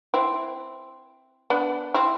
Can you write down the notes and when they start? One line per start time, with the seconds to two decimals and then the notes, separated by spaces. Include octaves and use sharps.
0.14 C4 E4
1.50 B3 D4
1.94 C4 E4